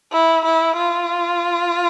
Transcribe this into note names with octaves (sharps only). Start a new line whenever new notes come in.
E4
E4
F4